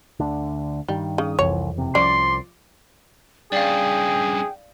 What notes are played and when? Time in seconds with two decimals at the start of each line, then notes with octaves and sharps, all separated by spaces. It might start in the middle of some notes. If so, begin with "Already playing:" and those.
0.20 D2 D3
0.88 G2 D#3 G3
1.18 C#3 D#6
1.39 F1 C2 F2 E3 C#5
1.78 F#1 C3
1.95 C2 F3 C#4 D5 C6 D6 A6
3.52 G2 C#3 G#4 D5 F5 G5